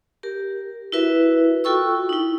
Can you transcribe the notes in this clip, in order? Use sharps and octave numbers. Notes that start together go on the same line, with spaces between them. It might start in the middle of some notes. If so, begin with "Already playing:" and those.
G4 A#4
E4 F#4 A#4 B4 E5
F4 F#4 A4 G5 C#6 E6
D#4 E4